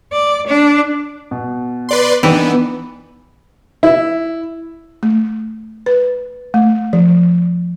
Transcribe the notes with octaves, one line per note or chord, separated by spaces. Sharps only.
D5
D4
B2
B4 D5 C6
E3 B3 D4 D#4 G5
E4
A3
B4
A3
F3